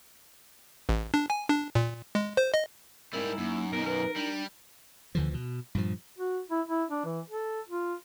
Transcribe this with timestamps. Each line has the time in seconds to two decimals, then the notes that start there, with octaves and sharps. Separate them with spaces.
0.89 A1
1.14 D4
1.30 G#5
1.49 D4
1.75 A#2
2.15 G#3
2.37 C5
2.54 D#5
3.13 G#2 G3 C4 E4 A#4
3.25 D#4
3.38 F#2 A#3
3.73 F#2 B2 B3 A#4
3.86 A#4 B4
4.16 G3 D4
5.15 D2 D3 E3 F3
5.34 B2
5.75 G2 A#2 F3
6.18 F#4
6.50 E4
6.68 E4
6.90 D4
7.05 E3
7.30 A4
7.69 F4